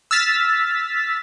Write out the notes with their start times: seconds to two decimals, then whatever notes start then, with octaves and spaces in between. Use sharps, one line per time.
0.11 E6 F6 A6 B6